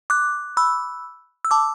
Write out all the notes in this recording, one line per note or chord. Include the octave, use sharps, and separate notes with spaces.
D6 F#6
B5 E6
E6
A5 D6